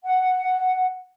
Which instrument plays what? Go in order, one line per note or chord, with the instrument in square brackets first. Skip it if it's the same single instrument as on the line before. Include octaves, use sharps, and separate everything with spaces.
[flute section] F#5